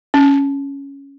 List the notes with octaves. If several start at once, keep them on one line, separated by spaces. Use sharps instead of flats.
C#4